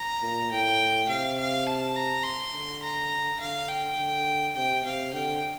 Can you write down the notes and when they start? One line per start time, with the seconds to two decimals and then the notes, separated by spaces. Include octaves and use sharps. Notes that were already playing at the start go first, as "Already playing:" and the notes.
Already playing: A#5
0.22 A#2
0.51 A2 G5
1.09 C3 F5
1.38 F5
1.66 A5
1.96 A#5
2.24 C6
2.53 D3
2.83 A#5
3.39 D3 F5
3.68 G5
3.98 D3
4.55 C3 G5
4.85 C3 F5
5.14 D3 G5